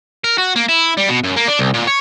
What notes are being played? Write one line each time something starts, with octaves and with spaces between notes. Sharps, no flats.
A#4
F#4
A#3
E4
G3
B2
F#2
A#3
D4
C2
A#2
C#5